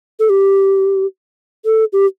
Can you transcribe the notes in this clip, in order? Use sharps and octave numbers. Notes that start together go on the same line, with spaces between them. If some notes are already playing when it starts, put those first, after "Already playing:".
A4
G4
A4
G4